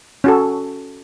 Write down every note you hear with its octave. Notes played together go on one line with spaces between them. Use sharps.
C#4 F#4 A4